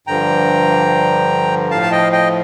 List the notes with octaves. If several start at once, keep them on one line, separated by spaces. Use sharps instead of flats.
G2 D3 F3 G5 A#5
A2 F3 F5 A5
A5
D#5 G5
D#5 G5